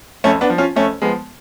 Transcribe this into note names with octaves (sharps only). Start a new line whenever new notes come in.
F2 A3 C#4
B3 D4
F3
C#4 F4
F2 A3 C#4
F3 G#3 B3